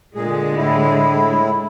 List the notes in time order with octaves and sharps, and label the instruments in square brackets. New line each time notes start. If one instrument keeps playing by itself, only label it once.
[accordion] A#2 G#4 [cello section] D3 G#3
[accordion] A2 E4